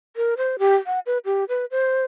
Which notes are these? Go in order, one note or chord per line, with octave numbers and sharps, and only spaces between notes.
A#4
C5
G4
F#5
B4
G4
B4
C5